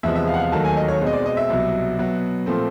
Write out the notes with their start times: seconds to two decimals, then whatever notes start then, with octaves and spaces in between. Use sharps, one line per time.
0.03 E2 C3 F3 G#3 B3 E5
0.16 E5
0.27 F5
0.34 F#5
0.39 F5
0.52 D#2 D#3 F#3 A3 A5
0.64 G#5
0.77 D#5
0.88 C#5
1.01 B2 G#3 C4
1.07 D#5
1.13 D5
1.26 D#5
1.37 E5
1.50 C2 B2 F#3
1.99 B2 F#3 B3
2.46 A#2 F3 A3 C4